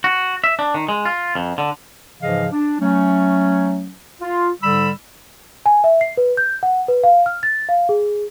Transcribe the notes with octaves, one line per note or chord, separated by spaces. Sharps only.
F#4
E5
D4
D#3
G#3
F4
F2
D3
G#2 C#3 E3 F3 D#5 F5
D4
F#3 A3 C#4
F4
G#2 D3 G3 B5 E6
G#5
E5
C7
B4
G6
F#5
B4
F5
F6
A6
F5
G#4